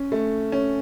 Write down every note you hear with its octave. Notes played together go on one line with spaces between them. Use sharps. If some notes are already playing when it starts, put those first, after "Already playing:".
Already playing: C#4
A3
C#4